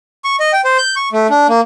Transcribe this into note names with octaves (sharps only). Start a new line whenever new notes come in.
C#6
D#5
G5
C5
G6
C#6
A3
D4
A#3